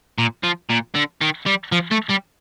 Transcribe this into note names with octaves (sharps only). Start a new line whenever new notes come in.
A#2
F3
A#2
D3
D#3
G3
F3
A3
G3